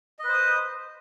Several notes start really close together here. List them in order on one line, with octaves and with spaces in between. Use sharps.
D#5 B4 C5 D#6